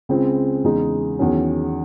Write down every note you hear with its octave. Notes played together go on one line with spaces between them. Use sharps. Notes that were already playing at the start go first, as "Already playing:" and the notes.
C#2 C#3 G#3 C4
E2 C#3 G#3 D#4
E2 D#3 F#3 C#4 G#4